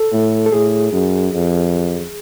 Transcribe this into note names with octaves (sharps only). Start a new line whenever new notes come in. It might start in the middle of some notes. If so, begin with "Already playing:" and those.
Already playing: A4
A2
A4
A2 G#4
F#2
F2